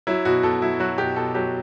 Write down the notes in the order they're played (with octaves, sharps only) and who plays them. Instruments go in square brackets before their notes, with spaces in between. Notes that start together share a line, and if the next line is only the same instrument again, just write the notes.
[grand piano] F#3 E4
B2 F#4
B2 A4
F#3 E4
F#3 F#4
B2 G4
B2 A4
F#3 G4